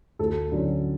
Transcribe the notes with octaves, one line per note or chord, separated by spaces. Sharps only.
D2 A4
D3 F#3 C#4